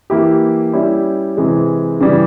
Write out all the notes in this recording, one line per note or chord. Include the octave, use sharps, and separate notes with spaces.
E3 A#3 E4 G4
G3 C#4 E4 G4
C3 E3 G#3
C#3 E3 G3